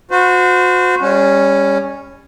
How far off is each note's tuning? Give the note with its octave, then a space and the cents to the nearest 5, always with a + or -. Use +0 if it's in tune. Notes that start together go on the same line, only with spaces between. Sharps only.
F#4 -30 C5 -30
G3 +30 C#4 +0